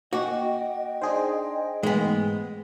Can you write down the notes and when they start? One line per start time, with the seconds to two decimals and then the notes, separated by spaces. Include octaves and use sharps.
0.13 A#3 F#4 D#5 G5 D6
1.01 D4 D#4 G#4 C5
1.83 G#2 E3 G#3 A3 B3 G#5